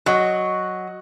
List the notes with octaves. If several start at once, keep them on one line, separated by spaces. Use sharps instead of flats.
F#3 D#5 C#6 F#6